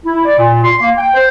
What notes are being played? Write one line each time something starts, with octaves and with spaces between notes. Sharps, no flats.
E4
D5
A#2
C6
A#3
G5
C5